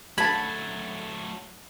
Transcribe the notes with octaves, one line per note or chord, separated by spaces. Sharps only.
D3 F#3 A3 A5 B5 G#6 A6